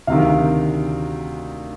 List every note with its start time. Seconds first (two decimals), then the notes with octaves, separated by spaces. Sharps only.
0.07 D2 C3 D#3 F5